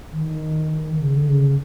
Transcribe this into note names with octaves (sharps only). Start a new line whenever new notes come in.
D#3
C#3
D3
C#3